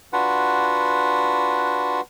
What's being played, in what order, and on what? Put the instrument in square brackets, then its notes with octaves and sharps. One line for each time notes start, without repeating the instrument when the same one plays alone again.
[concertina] D4 F4 F#4 B4 F#5